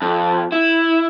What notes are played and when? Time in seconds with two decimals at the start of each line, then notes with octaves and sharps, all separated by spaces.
0.02 F2
0.52 E4